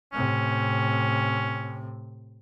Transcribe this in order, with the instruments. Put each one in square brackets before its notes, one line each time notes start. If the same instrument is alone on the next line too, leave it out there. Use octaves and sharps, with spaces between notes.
[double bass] A2 C3 [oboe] C#4